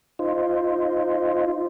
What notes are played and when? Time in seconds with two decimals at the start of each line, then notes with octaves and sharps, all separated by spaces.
0.19 D#4 F4 C5